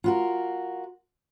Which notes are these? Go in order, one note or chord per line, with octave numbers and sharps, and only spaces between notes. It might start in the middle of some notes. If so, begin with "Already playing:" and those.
F4 F#4 A#4